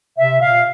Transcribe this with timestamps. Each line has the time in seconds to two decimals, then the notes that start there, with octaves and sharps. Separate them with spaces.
0.17 C3 E5
0.41 A#2 F5